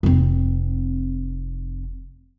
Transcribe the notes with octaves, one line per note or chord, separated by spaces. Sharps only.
F1 C4